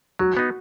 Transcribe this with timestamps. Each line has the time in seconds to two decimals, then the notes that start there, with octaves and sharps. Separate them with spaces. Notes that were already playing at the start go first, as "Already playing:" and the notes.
0.19 F#3 F#4
0.37 B3 D#4